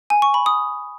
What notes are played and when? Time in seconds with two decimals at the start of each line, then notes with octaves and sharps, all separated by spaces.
0.10 G#5
0.22 C#6
0.34 B5
0.46 D#6